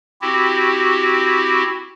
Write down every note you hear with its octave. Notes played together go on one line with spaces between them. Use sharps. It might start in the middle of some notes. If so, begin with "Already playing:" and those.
C4 E4 F#4 G4